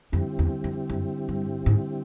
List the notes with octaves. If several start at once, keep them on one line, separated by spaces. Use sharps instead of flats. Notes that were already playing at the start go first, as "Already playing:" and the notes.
F2 D3 G3 C4 E4 G4
E2
F2
F#2
G2
G#2